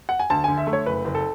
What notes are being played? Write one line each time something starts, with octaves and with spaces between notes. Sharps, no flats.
F#5
G#5
D2 A5
D3 G#5
E5
A3
C#5
F#1 B4
F#1
A4